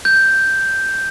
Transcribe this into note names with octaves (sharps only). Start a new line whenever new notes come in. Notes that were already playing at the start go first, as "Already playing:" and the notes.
G6